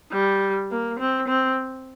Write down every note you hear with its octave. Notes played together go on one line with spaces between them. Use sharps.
G3
A#3
C4
C4